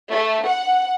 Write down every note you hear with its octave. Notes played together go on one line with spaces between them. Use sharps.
A3
F#5